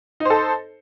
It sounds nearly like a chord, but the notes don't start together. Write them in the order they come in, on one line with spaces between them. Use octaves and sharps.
D#4 C5 A4